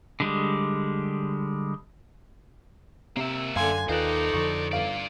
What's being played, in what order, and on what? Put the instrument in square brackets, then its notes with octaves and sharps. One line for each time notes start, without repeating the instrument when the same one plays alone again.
[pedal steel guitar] D3 G3 G#3
[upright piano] C3 [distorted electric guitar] A#3 E5
[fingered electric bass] F#2 [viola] D3 G#5 [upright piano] F5 C6
[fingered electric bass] D#2 [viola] D#4 A4 [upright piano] F4 B4 F#6 [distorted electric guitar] C5 D5
[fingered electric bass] F2 D3 F3 [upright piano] C#6
[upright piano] G1 F5 D7 [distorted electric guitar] F4 D5